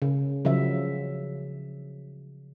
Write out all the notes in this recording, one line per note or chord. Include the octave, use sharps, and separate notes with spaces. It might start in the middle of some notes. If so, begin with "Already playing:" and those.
C#3
C#3 F3 F#3 E5